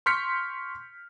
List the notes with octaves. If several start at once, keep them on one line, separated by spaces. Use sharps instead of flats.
C6 C#6 F6 G6 B6 C#7